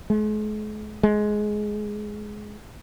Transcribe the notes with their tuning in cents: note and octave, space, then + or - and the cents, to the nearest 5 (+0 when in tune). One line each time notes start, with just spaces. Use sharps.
G#3 +45
G#3 +15